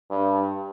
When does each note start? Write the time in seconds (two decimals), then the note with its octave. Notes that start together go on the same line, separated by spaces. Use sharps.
0.11 G2